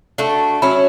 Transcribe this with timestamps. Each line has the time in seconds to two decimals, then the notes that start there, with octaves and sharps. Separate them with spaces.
0.18 A3 D4 F#4
0.62 F#3 C#4 E4